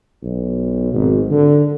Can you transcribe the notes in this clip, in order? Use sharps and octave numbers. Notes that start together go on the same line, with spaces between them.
B1
G#1
D3